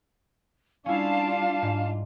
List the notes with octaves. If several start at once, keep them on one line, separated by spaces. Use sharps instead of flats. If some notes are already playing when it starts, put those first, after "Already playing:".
G3 C#4 D4 E4 F4 F5 A5
D7
G#2